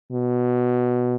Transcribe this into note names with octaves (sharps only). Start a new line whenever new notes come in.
B2